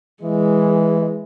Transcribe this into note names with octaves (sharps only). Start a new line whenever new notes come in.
E3 G#3